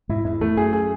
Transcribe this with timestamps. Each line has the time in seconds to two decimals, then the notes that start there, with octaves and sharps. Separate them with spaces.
0.09 G#2 B2 E4
0.25 E2 G#2 E4
0.41 E2 A3
0.57 F#2 G#4
0.73 G#4